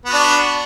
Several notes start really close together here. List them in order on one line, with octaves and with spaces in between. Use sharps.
B3 F#4 D4